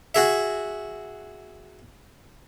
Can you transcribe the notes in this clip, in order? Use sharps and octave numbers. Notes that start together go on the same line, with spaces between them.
F#4 G#4 E5